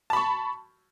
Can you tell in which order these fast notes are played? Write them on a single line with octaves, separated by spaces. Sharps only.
A5 B5 C#6